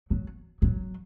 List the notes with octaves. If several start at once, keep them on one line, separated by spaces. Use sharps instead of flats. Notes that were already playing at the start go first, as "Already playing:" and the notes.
F#3
F#3